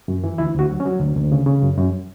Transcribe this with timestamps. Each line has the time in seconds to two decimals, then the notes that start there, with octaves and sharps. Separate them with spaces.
0.08 F#2
0.24 E3
0.38 D2 E4
0.54 D2 F#4
0.70 F#3
0.80 C#4
0.85 F#3
1.00 D2
1.16 D2
1.32 C#3
1.46 C#3
1.63 F#2
1.78 F#2